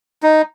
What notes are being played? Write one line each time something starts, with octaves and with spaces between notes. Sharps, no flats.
D#4